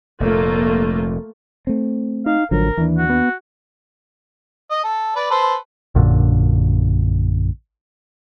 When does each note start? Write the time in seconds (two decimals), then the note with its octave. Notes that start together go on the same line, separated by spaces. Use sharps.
0.20 F1 A#2 A3 A#3 F4
1.67 A3 C4
2.26 D#4 F5
2.51 A1 D3 F3 F#3 A#4
2.78 D#2 E3 D4
2.98 F#4
3.10 B3
4.71 D#5
4.84 A4
5.16 B4 D5
5.31 A4 B4 C5
5.95 A#1 F#2 A#2 D3